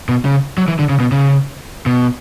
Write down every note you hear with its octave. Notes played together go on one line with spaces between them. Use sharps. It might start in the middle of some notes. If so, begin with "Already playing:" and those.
B2
C#3
F#3
E3
D3
C#3
B2
C#3
B2